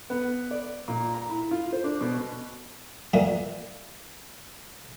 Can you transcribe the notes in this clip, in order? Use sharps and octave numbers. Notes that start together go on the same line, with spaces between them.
B3
D5
A#2
A#5
E4
F4
C5
D4
B2
B2
F2 D3 E3 A3 A#3 D4